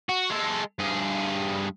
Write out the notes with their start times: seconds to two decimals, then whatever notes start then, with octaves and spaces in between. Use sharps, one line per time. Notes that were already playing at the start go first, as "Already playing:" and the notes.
0.09 F#4
0.30 G#3 A4
0.79 G2 G#4